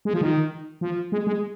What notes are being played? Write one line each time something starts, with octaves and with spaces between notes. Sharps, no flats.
G#3
F3
D#3
F3
G#3
G#3